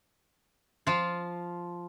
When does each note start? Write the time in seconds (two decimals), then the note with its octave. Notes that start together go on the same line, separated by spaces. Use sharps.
0.87 F3 F4